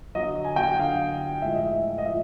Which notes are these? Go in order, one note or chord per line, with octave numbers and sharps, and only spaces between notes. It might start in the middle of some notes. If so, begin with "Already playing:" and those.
D3 F#3 D#5
G#5
G5
F#5
D3 F#3 F5
A2 F3 G#3 E5
D#5
E5
D#5
A2 F3 E5